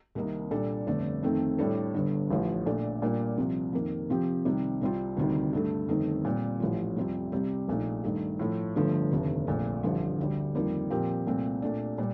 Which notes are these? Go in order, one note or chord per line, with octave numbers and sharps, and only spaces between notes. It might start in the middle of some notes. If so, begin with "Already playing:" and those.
C2 C3 D#3 A#3 D#4
A#2 G3 D4 A4
G1 F2 D3 A3 D4
F2 D#3 A3 C4
A2 G3 D4 A4
G1 G2 D3
A1 A2 F3
A#2 A3 D4 A4
A#2 G3 A#3 D4 F4
C2 C3 F3
F2 D#3 A#3
C3 F3 C4 G4
C2 C3 D#3 G3
C2 C3 G3 C4 F4
D2 C3 D#3 G3
G2 D3 A3
G1 F2 D#3 A3 D#4
A#2 G3 C4
A1 A2 F3
F2 C3 G3 C4 F4
C2 C3 G3 C4 G4
A#1 A#2 A3 D#4
G2 D#3 A3
A2 F3 A3
G1 G2 D3 F3 A3
F1 D#2 D3
A#1 A#2 A3
A1 G2 D3 F3
D2 D3 G3
F2 D#3 G3 A#3 F4
A#2 F3 C4 G4 A#4
C2 A#2 A3 C4
A#2 A3 D4
A#2 G3